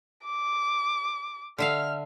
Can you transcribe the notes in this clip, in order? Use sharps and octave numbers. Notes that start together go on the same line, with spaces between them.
D6
D3 E5 F5 F6